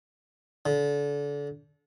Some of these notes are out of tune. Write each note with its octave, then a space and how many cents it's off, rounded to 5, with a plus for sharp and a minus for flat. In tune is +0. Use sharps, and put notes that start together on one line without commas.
D3 -30